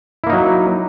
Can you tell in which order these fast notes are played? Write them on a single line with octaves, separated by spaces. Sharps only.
E4 A#3 D#4 F#3